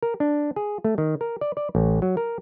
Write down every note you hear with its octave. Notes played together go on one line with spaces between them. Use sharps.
A#4
D4
G#4
A3
D#3
A#4
D5
D5
A1
F#3
A#4